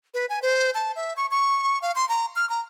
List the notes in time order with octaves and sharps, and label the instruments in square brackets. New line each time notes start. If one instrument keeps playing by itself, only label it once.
[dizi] B4
G#5
C5
A5
E5
C#6
C#6
F5
C6
A#5
F6
A#5